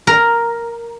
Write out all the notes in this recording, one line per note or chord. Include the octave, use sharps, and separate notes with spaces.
A#4